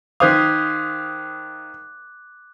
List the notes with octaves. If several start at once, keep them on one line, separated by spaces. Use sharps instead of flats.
D#3 C5 F5 D6 D#6 F#6 G#6 B6